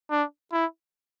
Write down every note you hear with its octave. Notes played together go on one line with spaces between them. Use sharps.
D4
E4